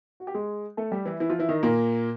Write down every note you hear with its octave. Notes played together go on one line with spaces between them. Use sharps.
F#4
G4
G#3 G#4
A3 A4
G3 G4
E3 E4
E3 E4
F3 F4
E3 E4
D#3 D#4
A#2 A#3